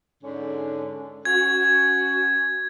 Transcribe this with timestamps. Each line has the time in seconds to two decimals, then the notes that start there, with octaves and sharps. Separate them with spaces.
0.23 G#2 D3 C#4
1.25 C#4 F#4 G#6